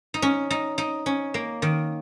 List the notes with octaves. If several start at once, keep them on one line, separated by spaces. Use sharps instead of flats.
D#4
C#4
D#4
D#4
C#4
A#3
D#3